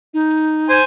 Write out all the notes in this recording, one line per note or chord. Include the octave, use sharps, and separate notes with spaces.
D#4
C5 G#5